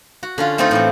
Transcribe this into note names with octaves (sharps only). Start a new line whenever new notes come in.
F#4
D3 C#4 F4
A3 C4 D#4 F4 A4
A2 E3 C4